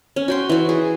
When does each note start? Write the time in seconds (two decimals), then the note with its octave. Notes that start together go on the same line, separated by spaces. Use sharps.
0.16 C#4
0.28 F#4 G5 C6
0.49 E3 F#4
0.69 G#4